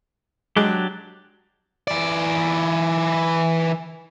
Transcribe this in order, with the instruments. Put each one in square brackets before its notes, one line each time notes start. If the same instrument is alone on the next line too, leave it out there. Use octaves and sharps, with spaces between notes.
[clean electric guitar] F#3 D4 G4 [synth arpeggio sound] G#3 G#4
[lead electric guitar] E3 D5